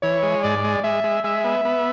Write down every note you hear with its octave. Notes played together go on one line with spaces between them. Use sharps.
E3 C#5
G#3
G#2 D5
G#3
G#3 E5
G#3
G#3 E5
B3
B3